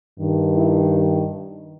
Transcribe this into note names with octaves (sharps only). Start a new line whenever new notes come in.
G2 D#3
E4